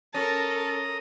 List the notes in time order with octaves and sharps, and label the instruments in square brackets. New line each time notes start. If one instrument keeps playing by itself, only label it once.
[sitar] C#4 [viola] A4 A#4 [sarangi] A5 [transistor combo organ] A#5 D#6